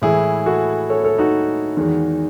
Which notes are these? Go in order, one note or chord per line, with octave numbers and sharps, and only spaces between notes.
A2 E3 G#3 E4 G#4
F#4 A4
A4 C#5
A4 C#5
D#4 F#4
E2 D#3 G#3